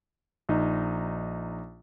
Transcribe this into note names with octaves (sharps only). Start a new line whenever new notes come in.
A#1 D#4